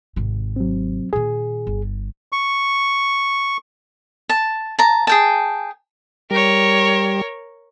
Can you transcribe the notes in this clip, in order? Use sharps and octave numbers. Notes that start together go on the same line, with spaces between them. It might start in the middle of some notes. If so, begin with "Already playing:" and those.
G#1 C3
F#3 C4
A#2 D#3 G#4
G1
C#6
A5
A5 A#5
G#4 G5 A5
G3 A#4 C#5